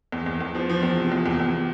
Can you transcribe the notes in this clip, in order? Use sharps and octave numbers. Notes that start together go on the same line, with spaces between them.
E2
E2
E2
F3
F3
E2
C3
E2
E2
E2